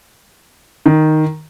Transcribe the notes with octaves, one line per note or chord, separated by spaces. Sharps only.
D#3